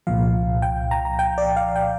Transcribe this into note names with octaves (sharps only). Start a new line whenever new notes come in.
C2 A#2 F3 F5
G5
A#5
A#5
G5
D5
F5
G5